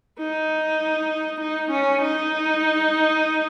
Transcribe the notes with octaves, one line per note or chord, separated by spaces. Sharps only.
D#4
D#4
C#4
D#4